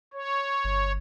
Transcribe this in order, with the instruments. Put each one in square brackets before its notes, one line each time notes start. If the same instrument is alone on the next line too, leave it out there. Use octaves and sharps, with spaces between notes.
[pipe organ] C#5
[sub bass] G1